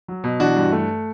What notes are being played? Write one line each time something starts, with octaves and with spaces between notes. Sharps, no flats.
F#3
B2
E3 D4 F#4
G2
A3